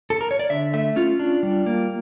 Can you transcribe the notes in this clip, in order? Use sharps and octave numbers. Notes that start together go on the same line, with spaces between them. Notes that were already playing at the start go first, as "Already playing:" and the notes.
A4
A#4
C#5
D5
D3 E5
A3 E5
C#4 F4
D4
G3
A#3